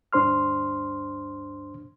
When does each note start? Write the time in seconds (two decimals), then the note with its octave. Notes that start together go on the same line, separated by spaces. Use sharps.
0.13 D2 G2 D4 C5 C6 F6